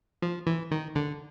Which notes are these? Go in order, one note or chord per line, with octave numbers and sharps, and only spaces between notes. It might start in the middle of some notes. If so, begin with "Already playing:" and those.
F3
E3
D#3
D3